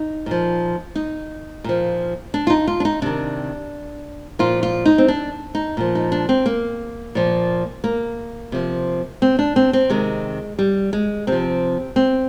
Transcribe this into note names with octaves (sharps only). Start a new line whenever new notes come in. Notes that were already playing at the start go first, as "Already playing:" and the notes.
Already playing: D#4
A#2 F3
D#4
A#2 F3
D4
F4
D#4
F4
D4
D#4
C3 D#3 D4
A#2 F3 F4
F4
D#4
C4
D4
D#4
A#2 F3
D#4
D4
C4
A#3
A#2 F3
A#3
C3 F3
C4
D4
C4
C4
C3 D#3 G#3
G3
G#3
C3 F3 C4
C4